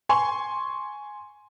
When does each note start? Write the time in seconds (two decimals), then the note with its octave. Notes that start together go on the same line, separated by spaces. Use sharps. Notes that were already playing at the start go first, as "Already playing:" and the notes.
0.09 G#5 C6 C#6